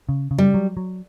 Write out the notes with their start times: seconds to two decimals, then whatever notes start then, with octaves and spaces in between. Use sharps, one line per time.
0.09 C#3
0.31 C#3
0.38 G3
0.54 F#3
0.77 F#3